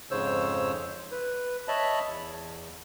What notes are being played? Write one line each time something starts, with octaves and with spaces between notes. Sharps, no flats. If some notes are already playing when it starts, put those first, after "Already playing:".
F2 G#2 C#3 C5 C#5 E6
B4
C#5 D#5 E5 A5 B5
E2